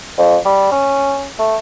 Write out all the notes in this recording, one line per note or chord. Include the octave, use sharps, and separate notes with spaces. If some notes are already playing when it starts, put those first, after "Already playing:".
F2
G3
C#4
A3